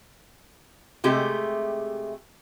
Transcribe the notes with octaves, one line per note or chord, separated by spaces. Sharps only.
C3 G#3 A3 G4